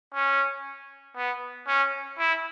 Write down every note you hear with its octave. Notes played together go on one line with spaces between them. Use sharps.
C#4
B3
C#4
E4